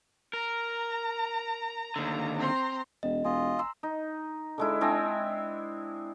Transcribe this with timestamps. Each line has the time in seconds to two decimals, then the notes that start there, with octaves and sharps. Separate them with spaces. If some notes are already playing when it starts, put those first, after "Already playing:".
0.33 A#4 A#5
1.96 D#2 D3
2.37 C4 A#5 C6
3.03 E1 D#5
3.25 E1 F4 D#5 G#5
3.59 A#5 C6 E6
3.83 D#4
4.58 D3 G#3 E4
4.81 G#3 C4 D4 E4